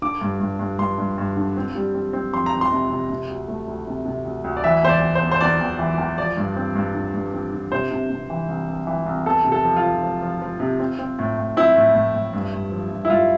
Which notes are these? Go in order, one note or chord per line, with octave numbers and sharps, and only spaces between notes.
D3 D6
G2
G2
G2
G2 C6
G2
G2
D3
C4
G3
C4
C4
F2 C6
A#5
F2
C6
C3
C3
C3
D2
A3
D2
C3
C3
D2
D2
D5
E3 E5
E2 C5
D5
E2
C5
E2
C5
E2 D5
E2
E3
E2
F3 D5
G2
C4
G2
D3
G2
C4
D3
C3 C5
C3
C3
E3
C2
C2
E3
C2
E2 A4
C3
A4
F3
F4
F3
F3
F3
F3
C3
C4
C4
A2
A2
C4 E4
A2
A2
A2
G2
G2
F3
G2
E4
G2 F4